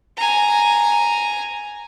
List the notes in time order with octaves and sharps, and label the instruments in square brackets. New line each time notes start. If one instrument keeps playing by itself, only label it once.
[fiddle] G#5 A#5